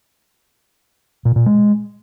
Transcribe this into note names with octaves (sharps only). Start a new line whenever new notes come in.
A#2
A#2
G#3